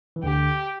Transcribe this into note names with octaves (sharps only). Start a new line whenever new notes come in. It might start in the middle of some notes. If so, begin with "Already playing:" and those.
E3
D2 D3 G4